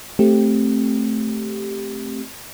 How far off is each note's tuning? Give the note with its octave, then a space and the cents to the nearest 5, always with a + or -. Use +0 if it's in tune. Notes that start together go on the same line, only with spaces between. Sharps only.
A3 +0 C4 +10 G4 +0